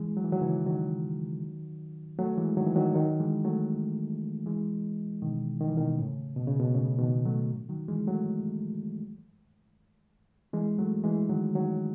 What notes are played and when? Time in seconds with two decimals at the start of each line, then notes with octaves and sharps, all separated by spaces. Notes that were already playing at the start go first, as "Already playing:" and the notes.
Already playing: E3 G#3
0.17 F#3
0.24 E3
0.32 D#3 F#3
0.41 C#3 E3
0.67 D#3 F#3
2.18 F#3 A3
2.37 E3 G#3
2.57 D#3 F#3
2.67 E3
2.76 D#3 F#3
2.95 D#3 F#3
3.20 E3 G#3
3.45 F#3 A3
4.46 E3 G#3
5.22 B2 D#3
5.61 D#3
5.69 E3
5.77 B2 D#3
5.98 A2 C#3
6.36 B2
6.47 C#3
6.60 B2
6.74 A2 C#3
6.99 B2 D#3
7.25 F#3 A3
7.69 D#3 F#3
7.88 E3 G#3
8.07 F#3 A3
10.53 E3 G#3
10.79 F#3 A3
11.04 E3 G#3
11.29 D#3 F#3
11.55 D#3 F#3